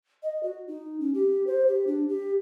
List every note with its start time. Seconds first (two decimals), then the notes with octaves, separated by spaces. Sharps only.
0.23 D#5
0.43 F#4
0.68 D#4
1.00 C#4
1.14 G4
1.47 C5
1.68 G4
1.87 D4
2.09 G4